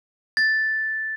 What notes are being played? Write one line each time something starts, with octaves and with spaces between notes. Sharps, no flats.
A6